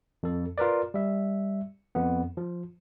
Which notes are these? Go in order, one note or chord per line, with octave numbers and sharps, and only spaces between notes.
F2 A4
F4 A#4 B4 D5
G3 E5
F2 B3
F3